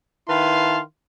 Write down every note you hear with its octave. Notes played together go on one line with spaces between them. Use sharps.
D#3 E4 B4 F5 A5 C6